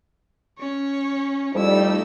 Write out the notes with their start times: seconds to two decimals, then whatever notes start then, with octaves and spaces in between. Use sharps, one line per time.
0.59 C#4 C#5
1.55 F2 G3 A3 D#4 E4 E6